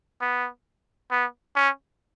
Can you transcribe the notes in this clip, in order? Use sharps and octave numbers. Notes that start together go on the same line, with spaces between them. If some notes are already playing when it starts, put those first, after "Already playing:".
B3
B3
C#4